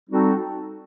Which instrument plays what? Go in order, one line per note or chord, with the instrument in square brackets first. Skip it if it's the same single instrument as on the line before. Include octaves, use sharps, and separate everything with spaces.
[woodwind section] G3 C4 D#4 F#4 A4